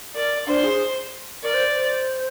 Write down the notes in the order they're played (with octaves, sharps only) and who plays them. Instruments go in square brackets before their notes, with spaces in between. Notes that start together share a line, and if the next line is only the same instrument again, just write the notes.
[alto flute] A#4 [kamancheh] D5
[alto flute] D4 [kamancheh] C5
[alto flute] G#4
[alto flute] A#4 [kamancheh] D5
[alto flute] C5
C5